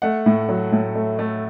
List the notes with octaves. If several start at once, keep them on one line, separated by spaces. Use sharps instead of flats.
A3 F#5
A2
F#3
A2
A3
A3